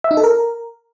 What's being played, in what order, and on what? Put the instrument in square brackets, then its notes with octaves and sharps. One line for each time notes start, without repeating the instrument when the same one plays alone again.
[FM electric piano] E5
D#4
A4
A#4